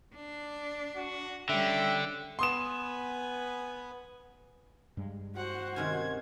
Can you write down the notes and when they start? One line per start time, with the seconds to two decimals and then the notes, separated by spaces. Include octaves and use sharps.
0.15 D4
0.97 F#4
1.49 D3 G3 C#4 E5 G5
2.39 B3 B4 G#5 C6 D#6 E7
4.97 G2 G3 G#3
5.37 F#4 C5 F#5
5.76 C3 D#3 C#4 G#6